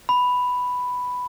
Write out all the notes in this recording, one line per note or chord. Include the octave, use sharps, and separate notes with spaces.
B5